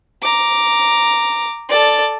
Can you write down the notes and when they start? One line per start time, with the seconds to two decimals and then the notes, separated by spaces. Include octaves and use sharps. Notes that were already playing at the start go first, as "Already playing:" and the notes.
0.22 A#5 D6
1.69 A4 D5